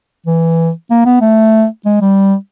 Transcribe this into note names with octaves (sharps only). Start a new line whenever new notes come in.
E3
A#3
B3
A3
G#3
G3